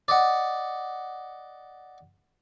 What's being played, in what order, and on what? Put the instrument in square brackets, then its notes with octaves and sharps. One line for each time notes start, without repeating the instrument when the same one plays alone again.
[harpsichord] D5 D#5 F#5